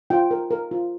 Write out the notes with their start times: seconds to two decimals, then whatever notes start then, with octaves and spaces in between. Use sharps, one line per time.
0.10 F4 G5
0.31 A#4
0.51 A#4
0.71 F4